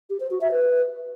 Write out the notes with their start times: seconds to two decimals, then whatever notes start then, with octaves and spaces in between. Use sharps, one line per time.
0.10 G4
0.20 C5
0.31 F#4
0.41 E5
0.51 B4